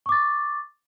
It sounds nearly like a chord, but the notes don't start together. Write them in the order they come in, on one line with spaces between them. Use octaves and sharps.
C#6 D6 A6